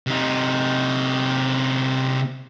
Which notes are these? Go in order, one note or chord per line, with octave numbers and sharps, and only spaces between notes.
C3 D#4